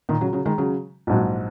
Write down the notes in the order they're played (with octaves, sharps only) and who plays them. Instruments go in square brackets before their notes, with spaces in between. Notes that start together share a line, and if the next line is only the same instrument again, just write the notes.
[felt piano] A#2 D#3
C#3 F#3
C#3 F#3
D#3 G#3
C#3 F#3
[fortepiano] A#1 G#2 F#3